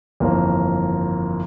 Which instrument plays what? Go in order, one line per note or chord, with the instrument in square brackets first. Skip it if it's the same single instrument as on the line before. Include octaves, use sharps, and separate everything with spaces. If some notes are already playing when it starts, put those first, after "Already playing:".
[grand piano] G1 F2 E3 A#3